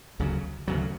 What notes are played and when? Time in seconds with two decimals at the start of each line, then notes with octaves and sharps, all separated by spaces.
0.20 D2 C#3 F#3
0.68 D2 C#3 F#3